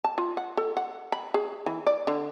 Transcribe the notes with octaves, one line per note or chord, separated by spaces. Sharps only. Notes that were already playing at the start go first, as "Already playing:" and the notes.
A5
F4
F#5
A4
F#5
B5
G#4
E3
D5
D3